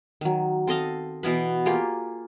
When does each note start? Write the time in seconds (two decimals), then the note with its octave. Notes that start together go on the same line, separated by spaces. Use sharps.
0.21 D#3 F#3
0.67 C4 A4 D#5 F5
1.23 B2 E3 B3 B4
1.66 A#3 F4 G4 G#4